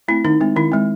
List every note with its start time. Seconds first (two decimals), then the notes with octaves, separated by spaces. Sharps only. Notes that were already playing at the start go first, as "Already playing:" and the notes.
0.08 A3 C4 E4
0.24 D#3 D#4
0.41 G#3 C4
0.56 D#3 E4
0.72 G#3 C4